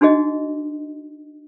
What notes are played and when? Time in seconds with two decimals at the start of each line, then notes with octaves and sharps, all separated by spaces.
0.01 D4 D#4 F#4 G#4 D#5